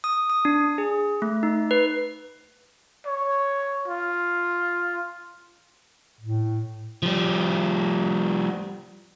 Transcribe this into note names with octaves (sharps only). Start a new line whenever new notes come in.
D#6
D#6
D4
G#4
A3
D#4
B4
C#5
F4
A2
F3 G3